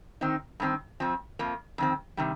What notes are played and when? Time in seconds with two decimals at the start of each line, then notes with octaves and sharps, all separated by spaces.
0.21 D#3 C4 D#4
0.60 G2 D#3 C4
1.00 F2 F3 C4
1.39 F2 F3 A#3
1.78 F2 D#3 C4
2.17 C3 D#3 G3